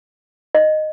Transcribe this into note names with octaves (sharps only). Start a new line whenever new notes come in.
D#5